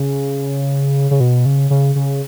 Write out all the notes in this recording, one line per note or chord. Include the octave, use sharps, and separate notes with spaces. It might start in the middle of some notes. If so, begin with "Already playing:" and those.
Already playing: C#3
C#3
B2
C#3
C#3
C#3